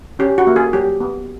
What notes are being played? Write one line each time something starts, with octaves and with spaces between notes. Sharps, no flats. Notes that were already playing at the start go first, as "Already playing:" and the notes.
C#4 G4
F#4
A#3
G#4
F#3 G4
B3